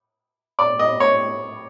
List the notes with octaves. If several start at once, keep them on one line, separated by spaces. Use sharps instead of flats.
D5
D#5
C#5